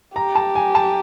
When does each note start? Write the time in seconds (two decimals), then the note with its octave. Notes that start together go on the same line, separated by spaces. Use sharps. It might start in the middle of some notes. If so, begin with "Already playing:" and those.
0.16 G4 A#5
0.35 A5
0.55 G#5
0.75 A5